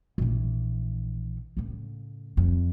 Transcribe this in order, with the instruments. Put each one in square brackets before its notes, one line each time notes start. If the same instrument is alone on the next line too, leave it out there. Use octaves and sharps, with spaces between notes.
[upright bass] A#1 E3
A2 C#3
F2